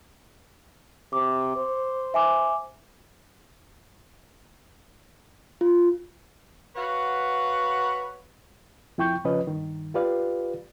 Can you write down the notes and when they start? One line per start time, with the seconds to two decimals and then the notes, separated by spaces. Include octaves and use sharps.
1.13 C3 D6
1.56 C5
2.14 E5 G#5 D6
5.61 F4
6.76 F#4 B4 C#5 F5 F#5
8.98 F2 E4 G5 C#6 G6
9.24 F2 C#3 F3 C#4 B4 D#5
9.47 G2 D#3
9.94 F4 G4 B4 D5 F5